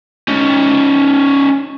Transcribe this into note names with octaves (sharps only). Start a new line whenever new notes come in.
C#4 D#4